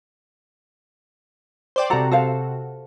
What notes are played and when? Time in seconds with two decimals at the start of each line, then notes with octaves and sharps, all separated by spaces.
1.76 C5 D5 G5
1.90 C3 F#4 A4 A#5
2.11 A4 C5 F5